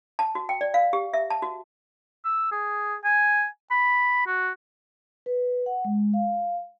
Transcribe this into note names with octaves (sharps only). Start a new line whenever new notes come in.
A5
F#4
G5
D5
F5
G4
E5
A5
F#4
E6
G#4
G#5
B5
F#4
B4
F#5
G#3
F5